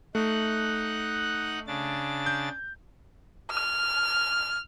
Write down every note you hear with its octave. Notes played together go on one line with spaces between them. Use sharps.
A3 D#4 F#5 F#6
C#3 D4 A6
G6
F6